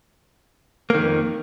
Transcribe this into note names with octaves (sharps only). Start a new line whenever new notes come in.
F2 D#3 A#3